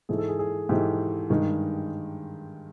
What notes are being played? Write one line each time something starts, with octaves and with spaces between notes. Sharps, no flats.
G#2 E3 A3 G#4
A4
G#4
G#4
G#2 E3 A3 G4
G2 D#3 G#3